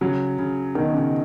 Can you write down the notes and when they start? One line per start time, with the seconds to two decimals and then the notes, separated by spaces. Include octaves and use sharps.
0.01 C#3 F#3
0.38 C#3
0.75 B2 D#3
0.94 C#3